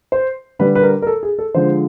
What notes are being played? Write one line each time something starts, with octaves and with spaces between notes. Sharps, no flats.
C5
D3 G3 B4
B4
A#4
A#4
A4
G#4
A4
D3 F3 G#3 C5